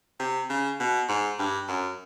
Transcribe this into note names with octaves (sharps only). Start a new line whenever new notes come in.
C3
C#3
B2
G#2
G2
F#2